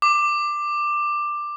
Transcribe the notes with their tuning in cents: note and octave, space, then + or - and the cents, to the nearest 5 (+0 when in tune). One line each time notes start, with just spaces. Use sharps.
D6 +10